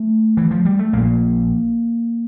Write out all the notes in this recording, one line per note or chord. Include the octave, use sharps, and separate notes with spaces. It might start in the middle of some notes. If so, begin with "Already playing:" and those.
Already playing: A3
E3
F3
G3
A3
A#1 A#2 A#3